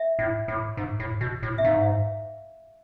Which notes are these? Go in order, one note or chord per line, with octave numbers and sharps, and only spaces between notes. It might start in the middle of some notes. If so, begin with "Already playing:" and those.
Already playing: E5
A2
A2
G#2
A2
B2
A2
E5
G#2 F5